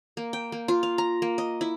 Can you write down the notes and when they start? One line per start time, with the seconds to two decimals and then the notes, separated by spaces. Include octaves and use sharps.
0.17 A#3
0.33 G5
0.52 A#3
0.68 F4
0.83 F5
0.98 A#5
1.22 A#3
1.38 D#5
1.61 E4